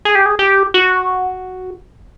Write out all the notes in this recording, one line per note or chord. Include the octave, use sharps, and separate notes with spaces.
G#4
G4
G#4
G4
F#4